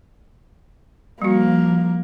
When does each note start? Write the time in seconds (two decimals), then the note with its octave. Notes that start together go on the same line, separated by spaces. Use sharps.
1.22 F3 G3 A#3 F#4